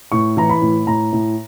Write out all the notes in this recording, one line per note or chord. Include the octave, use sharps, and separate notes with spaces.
A2 C#6
E3 A#5
B5
A2
A2 A#5
A2